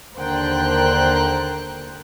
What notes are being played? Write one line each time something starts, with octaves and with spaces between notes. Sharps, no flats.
D#2 D3 A#4 C5 G5 F#6